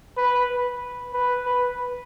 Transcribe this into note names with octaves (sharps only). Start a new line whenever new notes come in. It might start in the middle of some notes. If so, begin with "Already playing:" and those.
B4
B4
B4